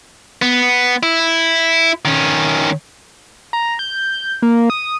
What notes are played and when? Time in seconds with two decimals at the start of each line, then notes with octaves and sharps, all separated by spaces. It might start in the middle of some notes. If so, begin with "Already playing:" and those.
0.42 B3
1.03 E4
2.05 D#3 C#4
3.53 A#5
3.79 G6
4.42 A#3
4.70 D#6